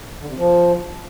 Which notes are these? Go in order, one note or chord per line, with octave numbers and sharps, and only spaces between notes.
D3
C3
F3